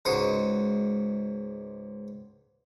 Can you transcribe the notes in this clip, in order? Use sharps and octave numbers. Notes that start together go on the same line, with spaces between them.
C#2 G#2 F#4 D#6